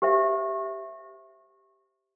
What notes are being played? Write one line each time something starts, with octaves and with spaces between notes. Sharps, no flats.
G4 C5 E5